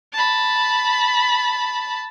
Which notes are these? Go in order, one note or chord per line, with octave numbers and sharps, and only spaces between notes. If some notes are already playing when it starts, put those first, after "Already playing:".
A5 B5